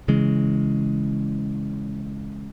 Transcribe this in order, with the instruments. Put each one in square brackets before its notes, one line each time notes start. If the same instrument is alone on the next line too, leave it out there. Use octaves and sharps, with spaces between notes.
[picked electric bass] C#3 E3 G#3